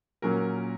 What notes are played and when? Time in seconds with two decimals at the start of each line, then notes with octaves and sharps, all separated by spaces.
0.22 A#2 F#3 C#4 A#4